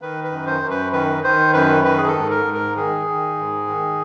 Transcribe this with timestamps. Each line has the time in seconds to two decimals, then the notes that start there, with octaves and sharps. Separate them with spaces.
0.01 D#3 B4
0.24 B4
0.31 F#2
0.46 C5
0.62 F#2
0.70 B4
0.93 D#3 B4
1.24 D#3 C5
1.53 F#2 B4
1.84 D#3 B4
1.98 G#4
2.07 A4
2.16 G#2
2.30 A#4
2.46 G#2
2.54 A#4
2.76 D#3 G#4
3.07 D#3
3.38 G#2
3.67 D#3